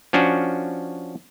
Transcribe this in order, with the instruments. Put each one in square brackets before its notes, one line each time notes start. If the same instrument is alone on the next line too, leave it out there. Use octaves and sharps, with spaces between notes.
[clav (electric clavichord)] F3 C#4 D4 F#4